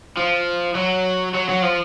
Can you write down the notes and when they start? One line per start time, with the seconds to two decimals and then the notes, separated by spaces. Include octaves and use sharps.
0.17 F3
0.75 F#3
1.35 F#3
1.49 F#3
1.63 F3